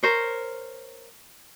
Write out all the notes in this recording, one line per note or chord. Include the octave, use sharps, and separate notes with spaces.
A#4 C5 C#5